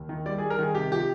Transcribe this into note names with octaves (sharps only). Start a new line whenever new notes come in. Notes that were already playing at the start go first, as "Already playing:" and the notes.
Already playing: D#2
D#3
G3 D5
G3 G#4
A#4
D#3 G#4
C3 G4
F3 G4